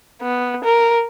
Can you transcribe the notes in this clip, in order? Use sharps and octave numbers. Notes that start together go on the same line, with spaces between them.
B3
A#4